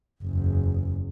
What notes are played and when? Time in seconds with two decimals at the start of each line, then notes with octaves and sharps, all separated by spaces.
0.23 F#1 E2